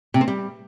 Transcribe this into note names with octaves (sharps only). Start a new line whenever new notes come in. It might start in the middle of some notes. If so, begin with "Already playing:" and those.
C3
C4
G3